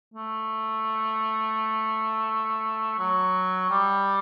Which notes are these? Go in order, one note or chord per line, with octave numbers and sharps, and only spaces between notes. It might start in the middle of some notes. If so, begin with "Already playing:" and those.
A3
F#3
G3